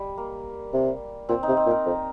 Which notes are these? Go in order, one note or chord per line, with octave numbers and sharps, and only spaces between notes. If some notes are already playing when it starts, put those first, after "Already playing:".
Already playing: G3
A#3
C3
A#2 C4
C3 D#4
C4
A#2
A#4
F2